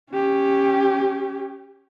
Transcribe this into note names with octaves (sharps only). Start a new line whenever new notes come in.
C#4 G4